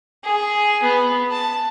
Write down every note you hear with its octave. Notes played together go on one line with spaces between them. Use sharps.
G#4
B3
A5